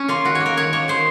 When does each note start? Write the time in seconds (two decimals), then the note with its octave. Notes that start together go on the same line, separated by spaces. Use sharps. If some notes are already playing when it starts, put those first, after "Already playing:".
Already playing: C#4
0.08 A#3 F4
0.25 D#3 F#4
0.35 C#5
0.40 A#3
0.46 A#4
0.57 D#3 C#5
0.73 A#3 C#5
0.88 D#3 C5